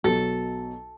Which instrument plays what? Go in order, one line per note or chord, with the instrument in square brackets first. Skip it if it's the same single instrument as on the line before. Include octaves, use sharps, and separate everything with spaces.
[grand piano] B1 B2 F#3 [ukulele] A4